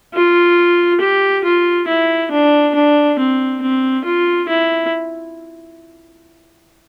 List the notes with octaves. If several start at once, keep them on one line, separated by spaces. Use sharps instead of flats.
F4
G4
F4
E4
D4
D4
C4
C4
F4
E4